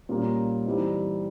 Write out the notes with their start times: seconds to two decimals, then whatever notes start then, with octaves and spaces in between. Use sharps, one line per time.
0.09 A#2 G3 A#3 C#4
0.66 E3 G3 C4 D#4